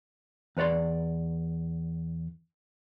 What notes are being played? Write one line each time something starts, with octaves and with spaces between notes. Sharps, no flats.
E2 B4 C#5 D5 C6